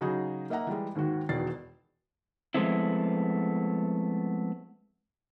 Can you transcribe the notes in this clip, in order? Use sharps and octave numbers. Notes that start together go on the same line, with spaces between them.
C#3 F#3 D#4 F#4 G#4
A#3 D#5 E5 F#5 A#5
E3 G3 G#3
D#2 G#2 D#3 F#4
E1 B2 D#3 D5 A6 C7
F3 G#3 A3 B3 C4 E4